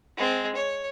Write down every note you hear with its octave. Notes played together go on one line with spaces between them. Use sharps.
G#3 C4
C#5